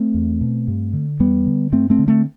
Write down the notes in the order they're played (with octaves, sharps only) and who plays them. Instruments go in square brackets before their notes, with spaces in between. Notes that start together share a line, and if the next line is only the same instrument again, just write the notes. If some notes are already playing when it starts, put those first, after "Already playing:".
Already playing: [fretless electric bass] A3 C4
E2
B2
G2
D3
E2 G3 B3
D3
G2 A3 C4
A3 C4
D3
A3 C4